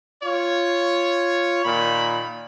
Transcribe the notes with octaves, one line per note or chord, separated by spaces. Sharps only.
F4 C#5
A#2 D#3 B5